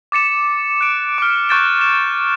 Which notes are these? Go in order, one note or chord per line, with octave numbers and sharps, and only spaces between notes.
D6 A6 C#7 E7
F#6 D7
D6 F6
C#6 F#6 G6 A6 D7 E7
E7